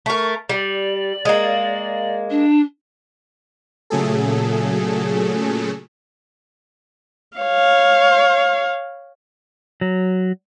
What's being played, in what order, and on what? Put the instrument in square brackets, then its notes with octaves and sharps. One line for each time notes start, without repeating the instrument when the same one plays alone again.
[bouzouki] A3 A#4 [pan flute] C#6
[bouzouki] G3 [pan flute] D5
[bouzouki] G#3 A#3
[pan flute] D4
[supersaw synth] A#2 C#3 F#3 A3 G#4 A4
[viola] C#5 F5
[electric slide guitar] F#3